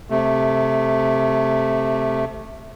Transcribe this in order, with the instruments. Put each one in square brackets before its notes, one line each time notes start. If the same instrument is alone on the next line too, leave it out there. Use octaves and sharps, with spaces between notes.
[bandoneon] C3 A3